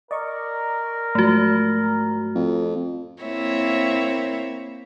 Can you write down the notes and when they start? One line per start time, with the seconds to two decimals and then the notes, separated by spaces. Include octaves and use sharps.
0.11 A#4 D5 D#5 C#6
1.15 G#2 F3 F#3 A3 F#4
2.35 F2
3.22 A#3 C4 E4 C#5 E5